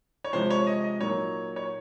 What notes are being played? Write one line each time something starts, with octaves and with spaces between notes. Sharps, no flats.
C#5
C3 F3 G#3 C5
C#5
D#5
D#5
A#2 F#3 A#3 D#4 C#5
C#5